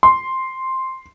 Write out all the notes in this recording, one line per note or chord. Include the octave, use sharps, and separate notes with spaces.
C6